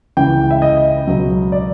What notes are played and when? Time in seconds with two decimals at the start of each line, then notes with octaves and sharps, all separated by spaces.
0.17 C#2 C#3 E3 G5
0.51 E5
0.62 D#5
1.07 C#2 B2 F#3
1.52 D5